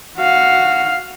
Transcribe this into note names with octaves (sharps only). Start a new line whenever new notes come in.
F#4 F5